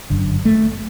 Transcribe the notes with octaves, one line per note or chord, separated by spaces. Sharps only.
G1 F#2 D3
A3